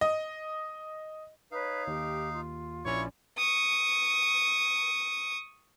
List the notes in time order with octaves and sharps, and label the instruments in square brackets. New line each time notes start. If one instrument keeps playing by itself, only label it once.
[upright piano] D#5
[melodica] D#4 F5 [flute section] B4 C#5
[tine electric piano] D#2 [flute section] G4
[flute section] F4
[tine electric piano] A#1 C#4 D5 [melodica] E4 [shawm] C#5
[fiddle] C#6 D#6